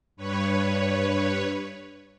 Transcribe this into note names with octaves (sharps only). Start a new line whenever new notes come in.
G2 B4 C#5